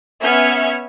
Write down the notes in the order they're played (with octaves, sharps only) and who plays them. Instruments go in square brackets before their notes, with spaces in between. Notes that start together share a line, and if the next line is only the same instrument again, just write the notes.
[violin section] B3 C#4 E5 F6 G#6 C#7